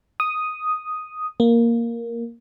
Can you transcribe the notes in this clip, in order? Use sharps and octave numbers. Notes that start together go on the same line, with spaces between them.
D#6
A#3